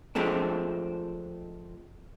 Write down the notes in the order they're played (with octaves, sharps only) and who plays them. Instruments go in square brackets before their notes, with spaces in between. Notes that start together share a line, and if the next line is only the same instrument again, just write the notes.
[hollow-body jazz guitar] F3 G#3 A3 C4 D4